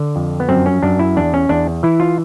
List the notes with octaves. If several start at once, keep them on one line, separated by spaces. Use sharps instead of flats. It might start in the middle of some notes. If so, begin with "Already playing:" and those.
Already playing: D3
F2
B3
F#2 C4
C#4
F#2 D4
E4
E2 D4
C#4
E2 D4
E3 E4
F4